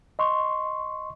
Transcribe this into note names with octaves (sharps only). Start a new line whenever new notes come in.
D#5 C6 C#6